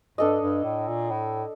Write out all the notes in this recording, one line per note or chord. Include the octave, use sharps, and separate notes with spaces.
G2 D4 A4 D#5
G2
A2
A#2
A2